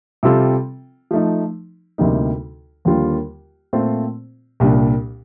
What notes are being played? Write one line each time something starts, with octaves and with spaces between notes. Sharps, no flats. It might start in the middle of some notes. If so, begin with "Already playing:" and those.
C3 G3 C4 F4 A4
F3 A3 D#4
D2 C3 G3 A#3 D#4
D#2 D3 G3 A#3 F4
A#2 A3 C4 F4 C5
C2 A#2 G3 D4